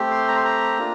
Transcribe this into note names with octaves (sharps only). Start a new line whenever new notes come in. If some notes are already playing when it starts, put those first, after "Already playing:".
Already playing: A3 C4 G4
C6
A#5
C6
A#5
A#3 D4 F4